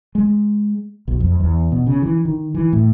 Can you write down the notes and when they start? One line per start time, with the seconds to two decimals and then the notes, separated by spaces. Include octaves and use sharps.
0.15 G#3
1.08 B1
1.20 F2
1.40 E2
1.72 B2
1.86 C#3
2.02 E3
2.25 D#3
2.55 E3
2.73 A2